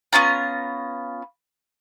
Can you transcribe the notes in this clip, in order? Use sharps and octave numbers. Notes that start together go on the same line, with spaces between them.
B3 C#4 F4 A#5